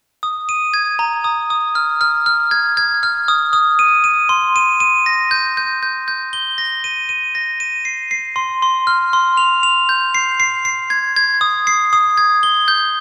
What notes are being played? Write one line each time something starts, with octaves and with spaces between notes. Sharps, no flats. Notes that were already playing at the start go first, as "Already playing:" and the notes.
D#6
D#7
G#6
A#5
D#6
D#6
F6
F6
F6
G#6
G#6
F6
D#6
D#6
D#7
D#7
C6
D#7
D#7
A#6
G6
G6
G6
G6
G7
A#6
D#7
D#7
A#6
D#7
C7
C7
C6
C6
F6
C6
F7
F7
G6
C7
C7
C7
G#6
G#6
D#6
C7
D#6
G#6
G7
G6